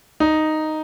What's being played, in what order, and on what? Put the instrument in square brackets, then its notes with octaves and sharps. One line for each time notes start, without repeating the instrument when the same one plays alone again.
[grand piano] D#4